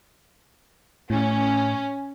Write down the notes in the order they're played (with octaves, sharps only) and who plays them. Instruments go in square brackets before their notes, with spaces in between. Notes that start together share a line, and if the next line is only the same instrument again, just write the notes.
[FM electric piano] A2 [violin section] C#4